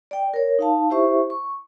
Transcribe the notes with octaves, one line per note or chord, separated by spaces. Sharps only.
D5 G5
A#4 C#5
D#4 F5 A5
E4 G4 C5 E5 C#6
C#6